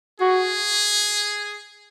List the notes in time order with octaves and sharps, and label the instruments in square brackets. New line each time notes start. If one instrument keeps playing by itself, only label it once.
[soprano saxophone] F#4 [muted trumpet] G#4